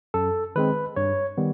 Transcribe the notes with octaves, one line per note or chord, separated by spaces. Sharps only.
F#2 A4
D#3 G#3 C4 B4
G2 C#5
D#3 G3 B3